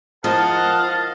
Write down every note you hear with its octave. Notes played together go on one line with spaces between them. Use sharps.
F3 A#4 D#5 F5 F#5 A5